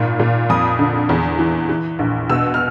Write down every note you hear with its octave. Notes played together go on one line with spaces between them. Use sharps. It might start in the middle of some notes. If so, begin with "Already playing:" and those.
Already playing: G#1 A#2
A#2
F2 D#6
D3
E2
E3
E3
A#1
B2 E6
F6